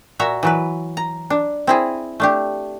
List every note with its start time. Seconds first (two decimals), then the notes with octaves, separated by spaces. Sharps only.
0.19 A#2 F#4 E5 A#5
0.43 E3 F#3 B4
0.97 A#5
1.30 D4
1.67 C4 E4 G#4
2.20 A3 D4 G4